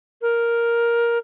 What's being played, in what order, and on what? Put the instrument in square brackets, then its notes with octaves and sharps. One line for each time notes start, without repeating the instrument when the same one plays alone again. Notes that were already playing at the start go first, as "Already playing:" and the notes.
[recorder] A#4